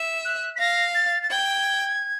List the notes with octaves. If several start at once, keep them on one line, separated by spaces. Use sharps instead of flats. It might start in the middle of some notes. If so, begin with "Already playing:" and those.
Already playing: E5
F#6
B6
F5 A#6
A6
A6
G5 G#6